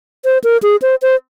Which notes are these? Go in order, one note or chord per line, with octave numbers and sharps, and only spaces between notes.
C5
A#4
G#4
C5
C5